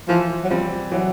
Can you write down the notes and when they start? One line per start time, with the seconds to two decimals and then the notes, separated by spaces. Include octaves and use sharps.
0.08 E3 F3
0.44 F#3
0.50 F3 G3 C4
0.91 E3 F#3